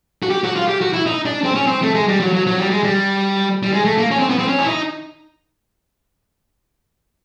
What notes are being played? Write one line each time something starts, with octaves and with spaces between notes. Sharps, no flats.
F#4
G4
F#4
F4
G4
F#4
E4
D#4
D4
C4
C#4
C4
A3
G#3
G3
F#3
F#3
F#3
G3
G#3
G3
G3
G#3
A3
A#3
C#4
C4
B3
C4
C#4
E4
D#4